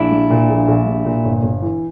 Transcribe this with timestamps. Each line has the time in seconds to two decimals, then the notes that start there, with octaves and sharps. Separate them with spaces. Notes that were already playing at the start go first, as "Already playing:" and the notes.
Already playing: A#1 D4 E4
0.12 G3
0.30 A#2
0.49 A#1
0.68 A#1
0.86 G3
1.05 A#2
1.25 G1
1.43 G1
1.62 E3